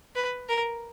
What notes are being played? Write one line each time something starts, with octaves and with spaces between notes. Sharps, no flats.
B4
A#4